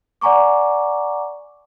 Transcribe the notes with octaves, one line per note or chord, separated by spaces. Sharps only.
D5 F#5 G#5 A#5 C#6 D6